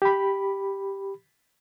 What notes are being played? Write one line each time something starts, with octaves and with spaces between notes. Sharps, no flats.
G4 B5